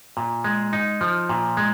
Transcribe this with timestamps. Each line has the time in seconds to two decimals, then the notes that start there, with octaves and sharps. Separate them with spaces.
0.17 A#2
0.44 G#3
0.73 D#4
1.01 F3
1.29 A#2
1.57 G#3